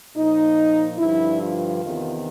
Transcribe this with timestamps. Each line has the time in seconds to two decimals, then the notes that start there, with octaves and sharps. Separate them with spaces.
0.15 A#2 F3 D#4
0.98 G2 D3 F3 E4
1.40 F4
1.81 E2 C3 D#3